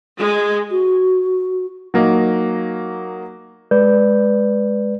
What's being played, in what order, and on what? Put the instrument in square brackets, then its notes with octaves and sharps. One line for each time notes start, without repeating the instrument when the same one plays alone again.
[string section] G#3
[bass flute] F#4
[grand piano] F#3 A#3 D#4
[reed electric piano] G#3 B4 D5 G6